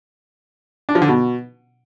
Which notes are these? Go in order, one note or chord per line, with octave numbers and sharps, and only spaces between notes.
D4
F3
D3
B2